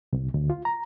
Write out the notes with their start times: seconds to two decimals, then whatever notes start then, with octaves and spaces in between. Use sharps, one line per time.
0.13 C2
0.34 D2
0.50 F4
0.65 A#5